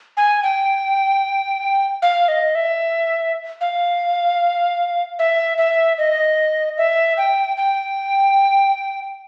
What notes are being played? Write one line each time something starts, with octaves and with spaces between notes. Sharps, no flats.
G#5
G5
F5
D#5
E5
F5
E5
E5
D#5
E5
G5
G5